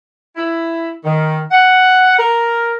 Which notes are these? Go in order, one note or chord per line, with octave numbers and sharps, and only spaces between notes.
E4
D#3
F#5
A#4